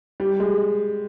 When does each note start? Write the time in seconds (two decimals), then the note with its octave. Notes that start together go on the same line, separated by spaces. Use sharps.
0.20 G3
0.40 G#3